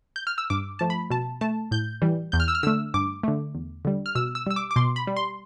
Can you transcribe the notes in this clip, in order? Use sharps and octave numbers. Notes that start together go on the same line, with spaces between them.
G6
F6
E6
G2 D6
F3 A3 A5
B5
B2 A5
A3 A5
A2 G6
E3 G3
E2 G6
F6
E6
F6
D3 A3 E6
G2 D6
D3 A3
E2
D3 G3
F6
B2 E6
E6
G3 E6
D6
D6
B2 C6
B5
G3
C6